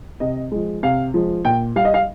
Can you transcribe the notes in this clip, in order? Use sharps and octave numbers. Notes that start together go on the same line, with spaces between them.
C3 D#5
F3 G#3
C3 F5
F3 G#3
A#2 G5
G3 F5
D#5
F5